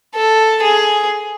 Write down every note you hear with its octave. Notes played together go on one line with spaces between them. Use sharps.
A4
G#4